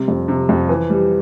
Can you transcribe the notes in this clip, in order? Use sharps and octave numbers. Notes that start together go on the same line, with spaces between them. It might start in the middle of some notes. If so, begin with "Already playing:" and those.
Already playing: C3 G3
F2
C3
F2
E3
G3